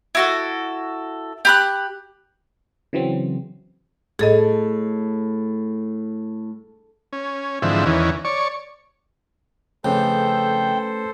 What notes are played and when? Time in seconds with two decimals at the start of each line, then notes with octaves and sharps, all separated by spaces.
0.15 E4 F#4 A4
1.45 G4 B5 F#6
2.93 C#3 E3 F#3 C4
4.19 A2 G#4 A4 D#5
7.13 C#4
7.62 G#2 D3 E3 F3 C4 E5
7.86 E2 D#3 E3 C#4
8.25 C#5 D5 C#6
9.84 F2 C#3 A3 C#4 A4 B4 C5 G5